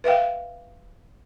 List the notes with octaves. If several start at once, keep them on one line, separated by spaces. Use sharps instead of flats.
B4 E5 F5 G5